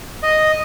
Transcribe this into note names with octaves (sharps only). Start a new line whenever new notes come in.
D#5